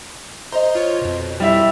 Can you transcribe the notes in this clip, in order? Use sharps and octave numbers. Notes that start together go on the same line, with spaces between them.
C5 D#5 A#5 C6
F4 C#5
F2 B2
G3 E4 E5